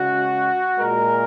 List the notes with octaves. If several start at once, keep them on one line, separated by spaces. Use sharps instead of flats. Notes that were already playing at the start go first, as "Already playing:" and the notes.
Already playing: C#3 G#3 F#4
A#2 G#3 A#4